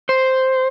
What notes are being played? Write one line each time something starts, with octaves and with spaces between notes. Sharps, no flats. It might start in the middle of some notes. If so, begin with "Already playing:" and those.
C5